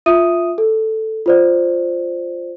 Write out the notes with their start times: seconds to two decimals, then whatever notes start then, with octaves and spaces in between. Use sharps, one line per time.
0.06 F4 E5 D#6 D#7
0.58 A4
1.26 F4 C5 D5